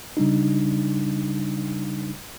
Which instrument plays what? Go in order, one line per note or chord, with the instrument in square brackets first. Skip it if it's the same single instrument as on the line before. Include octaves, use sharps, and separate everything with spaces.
[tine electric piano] C#3 G3 D4 D#4